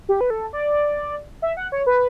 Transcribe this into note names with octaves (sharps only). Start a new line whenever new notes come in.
G4
B4
A4
D5
E5
F#5
C#5
B4